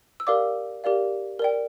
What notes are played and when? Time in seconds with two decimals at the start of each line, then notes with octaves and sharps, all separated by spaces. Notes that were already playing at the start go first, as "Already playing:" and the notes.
0.20 E6
0.27 G4 A#4 D5 F5 D6
0.84 G4 A#4 D5 F5
1.39 A#4 D5 G5